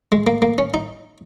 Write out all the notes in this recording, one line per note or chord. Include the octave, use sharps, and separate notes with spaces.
G#3
A#3
A#3
C#4
D#4